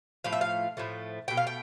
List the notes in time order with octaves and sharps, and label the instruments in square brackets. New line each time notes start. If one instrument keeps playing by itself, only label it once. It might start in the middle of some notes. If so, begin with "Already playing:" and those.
[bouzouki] A2 F3 A3 F5
E5
F5
A2 F3 A3
B2 A3 G5
F5
G5